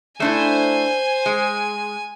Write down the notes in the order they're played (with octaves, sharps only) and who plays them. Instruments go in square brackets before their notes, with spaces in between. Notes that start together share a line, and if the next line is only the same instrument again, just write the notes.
[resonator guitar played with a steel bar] A3 D4 E4 [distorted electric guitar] C5 [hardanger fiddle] G#5
[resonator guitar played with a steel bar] G#3